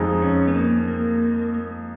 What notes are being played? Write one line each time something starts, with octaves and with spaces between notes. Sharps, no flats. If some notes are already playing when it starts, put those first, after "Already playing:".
Already playing: F2 F3 G#3 D#4 G#4
C#4
B3
A#3
A#3